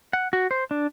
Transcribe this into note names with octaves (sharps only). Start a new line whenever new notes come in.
F#5
F#4
C5
D4